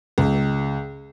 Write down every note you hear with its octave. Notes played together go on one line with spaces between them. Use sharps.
C#2